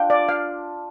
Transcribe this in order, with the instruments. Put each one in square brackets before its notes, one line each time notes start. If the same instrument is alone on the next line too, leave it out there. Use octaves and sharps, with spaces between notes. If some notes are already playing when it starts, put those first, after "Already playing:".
Already playing: [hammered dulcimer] D4 F4 [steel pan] G5
[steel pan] D5
F5